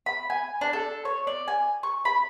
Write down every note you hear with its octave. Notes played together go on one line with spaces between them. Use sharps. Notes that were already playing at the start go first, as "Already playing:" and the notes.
B5
G#5
D4
A4
C#5
D5
G#5
C#6
B5